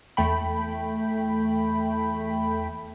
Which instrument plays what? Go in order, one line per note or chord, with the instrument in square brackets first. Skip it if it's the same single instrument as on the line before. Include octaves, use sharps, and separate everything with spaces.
[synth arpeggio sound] E2 A3 G5 B5